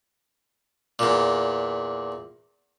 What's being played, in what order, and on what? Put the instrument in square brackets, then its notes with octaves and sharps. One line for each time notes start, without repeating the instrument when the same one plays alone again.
[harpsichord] E2 A#2